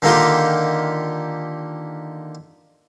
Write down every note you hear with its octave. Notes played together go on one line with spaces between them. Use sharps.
D3 D#3 A#3 D#4 F4 G4